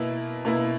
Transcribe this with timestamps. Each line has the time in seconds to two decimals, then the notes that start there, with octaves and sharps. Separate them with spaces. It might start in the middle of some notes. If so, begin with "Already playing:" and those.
Already playing: B2 A#3 E4
0.45 B2 A#3 E4